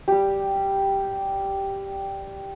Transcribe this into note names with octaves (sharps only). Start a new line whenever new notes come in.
G3 G4